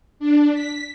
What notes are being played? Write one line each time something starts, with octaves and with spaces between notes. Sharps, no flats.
D4
B6